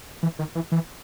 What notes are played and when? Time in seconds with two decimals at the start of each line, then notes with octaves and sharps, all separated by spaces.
0.23 E3
0.39 D#3
0.55 E3
0.72 E3